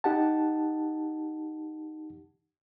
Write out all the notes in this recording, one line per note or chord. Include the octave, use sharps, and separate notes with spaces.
D#4 G4 F#5 A5